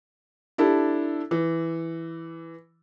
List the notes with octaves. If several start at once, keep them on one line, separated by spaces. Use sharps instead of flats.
D4 E4 G4 A4
E3